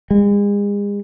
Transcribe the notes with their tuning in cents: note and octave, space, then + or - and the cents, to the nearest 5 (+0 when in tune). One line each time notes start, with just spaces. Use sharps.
G#3 -40